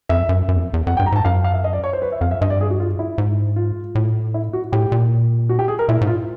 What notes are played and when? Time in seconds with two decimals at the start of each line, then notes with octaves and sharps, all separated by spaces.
0.09 F2 E5
0.29 F#2
0.48 F#2
0.56 E2
0.61 F2
0.74 E2
0.87 F2 F#5
0.97 G5
0.99 G2
1.06 A#5
1.12 G#2 A5
1.25 F#2 F5
1.44 F5
1.54 E5
1.64 D#5
1.73 D5
1.84 C#5
1.93 C5
2.02 B4
2.12 E5
2.21 F2 F5
2.31 E5
2.41 G2 D#5
2.50 D5
2.61 G#4
2.70 F#4
2.80 F4
2.99 E4
3.18 G#2
3.56 F4
3.95 A2
4.34 E4
4.53 F#4
4.72 A2 G4
4.92 A#2
5.49 F#4
5.59 G4
5.68 G#4
5.79 A#4
5.89 A#2 E4
6.01 G#2
6.07 F4